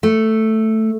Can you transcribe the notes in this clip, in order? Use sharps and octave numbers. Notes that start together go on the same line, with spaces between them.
A3